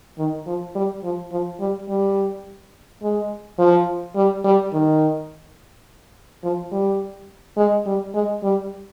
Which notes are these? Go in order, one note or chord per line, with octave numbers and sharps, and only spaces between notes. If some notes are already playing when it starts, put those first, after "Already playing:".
D#3
F3
G3
F3
F3
G3
G3
G#3
F3
G3
G3
D#3
F3
G3
G#3
G3
G#3
G3